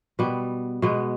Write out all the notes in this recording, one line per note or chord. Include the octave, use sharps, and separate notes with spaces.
B2 G3 B3
B2 G#3 B3